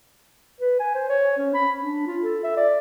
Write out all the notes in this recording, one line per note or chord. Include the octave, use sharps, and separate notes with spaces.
B4
G#5
C5
C#5
C#4
B5
D4
F4
A4
E5
D5